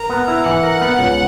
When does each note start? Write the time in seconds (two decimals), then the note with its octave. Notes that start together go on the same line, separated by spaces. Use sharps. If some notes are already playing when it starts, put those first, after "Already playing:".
Already playing: A#4 A#5
0.10 B3
0.28 E4
0.45 E3 F#5
0.63 A#4
0.81 B3
0.99 C#2